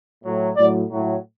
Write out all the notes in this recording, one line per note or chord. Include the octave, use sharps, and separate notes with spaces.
A2 F#3
A2 F#3 D5
A2 F#3